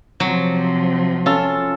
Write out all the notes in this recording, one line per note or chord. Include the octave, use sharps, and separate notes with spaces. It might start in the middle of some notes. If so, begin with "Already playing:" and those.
C3 F3 F#3
C#4 F4 A4